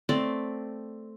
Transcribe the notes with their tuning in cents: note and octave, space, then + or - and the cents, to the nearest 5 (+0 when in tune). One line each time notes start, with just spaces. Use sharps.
A3 +0 C4 +0 D5 +0